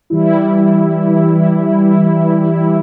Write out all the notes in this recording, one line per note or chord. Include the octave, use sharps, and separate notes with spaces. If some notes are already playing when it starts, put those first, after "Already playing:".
E3 G3 E4